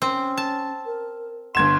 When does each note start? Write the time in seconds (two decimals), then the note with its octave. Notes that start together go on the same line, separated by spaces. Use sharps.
0.02 C4 C#4
0.38 A5
0.86 A#4
1.55 G1 C6 G#6 E7